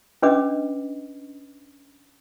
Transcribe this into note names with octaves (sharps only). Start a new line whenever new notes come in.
C#4 D4 B4 D#5 D6